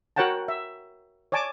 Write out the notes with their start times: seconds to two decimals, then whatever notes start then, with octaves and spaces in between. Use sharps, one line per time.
0.16 F#4 A#4 C#5 F#5 G5 A5
0.48 E5
1.32 C#5 D5 G#5 A5 D6